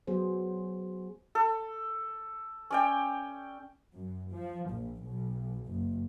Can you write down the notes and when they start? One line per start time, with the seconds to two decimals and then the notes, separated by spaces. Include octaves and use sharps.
0.07 F#3 B3 G#4 C5
1.35 A4
2.71 C#4 D5 G5
3.94 F#2
4.32 F3
4.69 A#1
5.03 B1
5.64 F#1